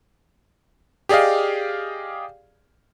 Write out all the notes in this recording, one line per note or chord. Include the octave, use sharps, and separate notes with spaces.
G4 G#4 D5 D#5 F5